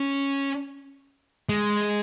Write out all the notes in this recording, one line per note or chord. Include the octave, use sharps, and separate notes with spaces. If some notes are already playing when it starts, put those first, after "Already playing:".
Already playing: C#4
G#3